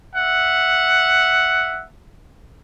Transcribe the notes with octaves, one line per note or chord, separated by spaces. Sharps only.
E5 F#5